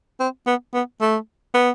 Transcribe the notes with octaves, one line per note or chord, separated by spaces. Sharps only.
C4
B3
B3
A3
B3